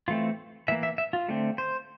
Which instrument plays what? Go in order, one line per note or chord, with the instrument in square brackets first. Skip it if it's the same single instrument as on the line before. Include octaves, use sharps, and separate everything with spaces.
[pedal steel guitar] E3 A3 C4 F4
E3 A#3 E5
E5
E5
F4
D3 A3 C4
C5